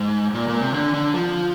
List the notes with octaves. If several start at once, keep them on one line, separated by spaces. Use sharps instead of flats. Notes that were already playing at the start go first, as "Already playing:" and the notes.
Already playing: G#2
A#2
A#2
C3
D3
D3
F3